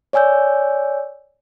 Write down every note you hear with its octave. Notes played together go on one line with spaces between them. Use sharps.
C#5 D5 G#5 E6 G6